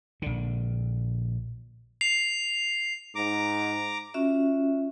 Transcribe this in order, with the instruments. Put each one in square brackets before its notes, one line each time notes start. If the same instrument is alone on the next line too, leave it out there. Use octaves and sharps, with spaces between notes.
[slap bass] A#1 D3
[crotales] C7 F7
[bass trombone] G#2 [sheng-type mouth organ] A#5 D6
[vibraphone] C#4 F4 F#4 E5